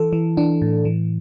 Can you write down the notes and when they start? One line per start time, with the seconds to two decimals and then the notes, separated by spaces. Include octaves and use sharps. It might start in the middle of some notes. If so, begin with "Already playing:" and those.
Already playing: E3 A4
0.13 E3
0.37 E3 D4
0.62 A2
0.85 E3